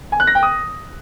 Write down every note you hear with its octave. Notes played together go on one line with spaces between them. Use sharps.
G#5
F#6
A#6
G5
D#6